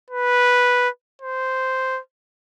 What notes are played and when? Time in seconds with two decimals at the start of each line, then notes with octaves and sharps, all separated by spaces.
0.10 B4
1.22 C5